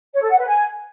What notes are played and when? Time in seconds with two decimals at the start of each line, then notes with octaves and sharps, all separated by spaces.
0.14 C#5
0.22 A4
0.31 F#5
0.39 B4
0.48 G#5